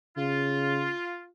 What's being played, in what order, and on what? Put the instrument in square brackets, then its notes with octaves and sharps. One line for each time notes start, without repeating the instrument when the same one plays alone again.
[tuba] C#3 [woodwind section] F4